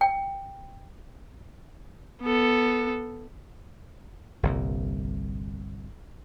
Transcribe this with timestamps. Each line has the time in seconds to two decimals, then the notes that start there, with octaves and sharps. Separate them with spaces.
0.01 G5
2.22 B3 A4
4.43 G1 C2 A#2